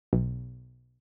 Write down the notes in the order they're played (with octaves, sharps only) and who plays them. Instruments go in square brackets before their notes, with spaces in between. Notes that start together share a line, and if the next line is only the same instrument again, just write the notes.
[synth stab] B1